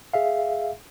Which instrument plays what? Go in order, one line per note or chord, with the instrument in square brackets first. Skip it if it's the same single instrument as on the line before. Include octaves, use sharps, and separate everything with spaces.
[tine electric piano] G#4 E5 F5